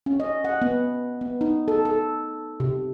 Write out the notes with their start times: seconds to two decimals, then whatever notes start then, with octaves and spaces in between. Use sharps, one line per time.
0.06 C#4
0.20 D#5
0.45 F#5
0.62 B3
1.21 B3
1.41 D#4
1.68 A4
1.85 A4
2.60 C3